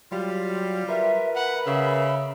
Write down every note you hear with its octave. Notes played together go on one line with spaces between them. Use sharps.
F#3 G3 F4
A#4 B4 E5
F#5 B5
C#3 E5